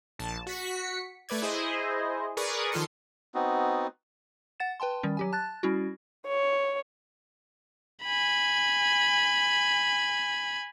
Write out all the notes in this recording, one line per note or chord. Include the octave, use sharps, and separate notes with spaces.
A#1 A5
F#4 B6 C#7
A3 B4 D5 G#6
E4 G#4 C5 D#5
G#4 A#4 B4 D5 C#6 D#6
D#3 F3 F4 A4 C6 C#7
B3 C4 D#4 F#4
F#5 A6 E7
B4 G5 A5 C6
D#3 G3 C#4
F#3 G4 G#5
A5 F#6 A6
G3 C#4 E4 F#4
C#5
G#5 B5